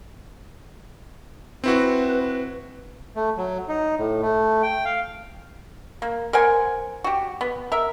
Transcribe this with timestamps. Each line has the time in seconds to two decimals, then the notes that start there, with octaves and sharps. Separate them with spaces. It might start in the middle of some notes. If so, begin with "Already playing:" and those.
1.64 C4 E4 F#4 B4
3.16 A3
3.37 F#3
3.68 D#4
3.98 A2
4.22 A3
4.63 G5
4.85 F5
6.02 A#3
6.33 A#4 C5 F#5 G#5
7.04 F#4 G4
7.41 B3
7.72 A#4 E5